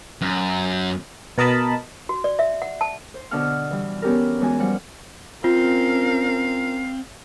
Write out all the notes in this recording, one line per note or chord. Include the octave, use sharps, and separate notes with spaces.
F#2
B2 A#4 D#5 A5 B5
F#4
D5
E5
F#5
A5
C5
B2 D3 D4 D#5 F#5 F6
E3 G3
B3 C#4 G4 A4 A#4
E2 E3 G#3 F#4 G#5
F3 G3 F#5
C4 C#4 F4 A#4 F5